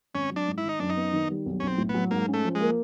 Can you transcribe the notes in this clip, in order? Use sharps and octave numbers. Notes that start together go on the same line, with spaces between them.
G#1 C#4
F#3
D4
G#2
E4
D#3 D#4
F#2 D4
D#4
B3
D#3
G3
B1
B1 C#4
C4
A2
B3
F#3
G#2 A#3
C#4
A3
F3
G#3
A#3